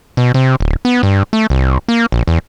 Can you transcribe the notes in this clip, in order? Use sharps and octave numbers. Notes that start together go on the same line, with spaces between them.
B2
C3
D1
B3
G2
A3
C2
A#3
A#1
E2